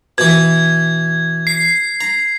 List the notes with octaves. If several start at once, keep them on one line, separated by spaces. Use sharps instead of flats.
B2 E3 G#6
C7
A#5